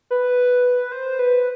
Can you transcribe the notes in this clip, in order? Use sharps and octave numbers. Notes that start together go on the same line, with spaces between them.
B4
C5
B4